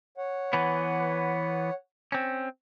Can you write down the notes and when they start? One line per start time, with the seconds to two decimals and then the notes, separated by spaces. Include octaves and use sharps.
0.18 C#5 F#5
0.53 E3 B3
2.12 C4 C#4